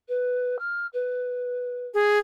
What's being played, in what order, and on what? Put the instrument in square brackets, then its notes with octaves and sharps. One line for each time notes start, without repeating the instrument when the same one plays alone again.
[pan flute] B4
F6
B4
[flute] G#4